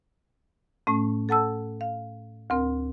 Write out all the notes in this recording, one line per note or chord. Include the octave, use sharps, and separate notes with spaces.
A2 A3 C#4
A4 F#5 A5 E6
F5
D2 C4 A#4